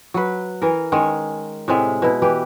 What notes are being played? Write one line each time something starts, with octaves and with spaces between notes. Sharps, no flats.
F#3 B4
E3 A#4
D#3 G#3 C#4 C#5
A2 C3 G#3 E5
B2 E4
E3 G4 B4